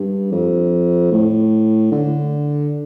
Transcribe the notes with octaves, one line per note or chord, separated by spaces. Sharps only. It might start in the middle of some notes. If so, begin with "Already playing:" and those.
Already playing: G2
F2
A2
D3